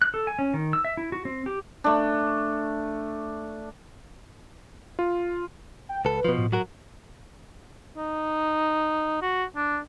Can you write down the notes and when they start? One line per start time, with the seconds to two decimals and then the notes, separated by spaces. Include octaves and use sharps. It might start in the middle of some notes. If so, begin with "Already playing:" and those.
0.02 F#6
0.14 A4
0.27 G#5
0.39 C#4
0.54 D#3
0.73 E6
0.85 E5
0.97 E4
1.12 F#4
1.25 C4
1.46 G4
1.84 A3 D4
4.99 F4
5.89 G5
6.05 C#2 A4 B4
6.25 B2 F3
6.38 A2
6.52 F#3 F#4 A#4
7.97 D#4
9.22 F#4
9.56 D4